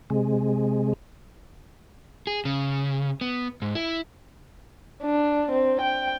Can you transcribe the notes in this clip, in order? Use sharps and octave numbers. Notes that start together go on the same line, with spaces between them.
C3 G#3
G#4
C#3
B3
G#2
E4
D4
C4
G5